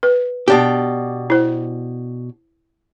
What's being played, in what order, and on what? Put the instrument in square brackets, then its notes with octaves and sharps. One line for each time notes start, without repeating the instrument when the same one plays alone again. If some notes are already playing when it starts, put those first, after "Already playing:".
[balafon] B4
[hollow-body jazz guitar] B2 D4 G4
[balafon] E4 C5